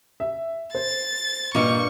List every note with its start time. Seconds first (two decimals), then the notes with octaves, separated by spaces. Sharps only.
0.20 E5
0.75 C5 A6
1.55 G2 A#2 A#3 D#5 C#6 C#7